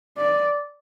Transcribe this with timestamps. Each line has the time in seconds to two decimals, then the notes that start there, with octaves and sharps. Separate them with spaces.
0.17 D5